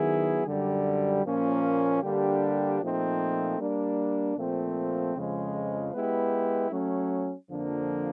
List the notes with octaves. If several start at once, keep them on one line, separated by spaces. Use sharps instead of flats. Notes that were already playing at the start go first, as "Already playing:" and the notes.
Already playing: D#3 F#3 B3 E4 G#4
F#2 D3 G3
A#2 F3 A#3 C#4
D3 G3 A#3 D4 G4
A#2 F3 A3 C4 D#4
G3 A#3 D4
A#2 F3 A3 C4
F2 C#3 F3 G#3
G#3 B3 E4 G4 B4
F#3 A3 C#4
F2 D3 F3 A#3 D4